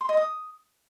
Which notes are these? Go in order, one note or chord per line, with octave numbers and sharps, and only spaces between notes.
C6
D#5
D#6